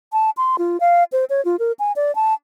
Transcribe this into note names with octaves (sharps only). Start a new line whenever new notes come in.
A5
C6
F4
F5
C5
C#5
F4
A#4
G#5
D5
A5